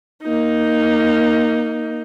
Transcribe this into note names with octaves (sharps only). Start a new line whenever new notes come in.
A#3 D#4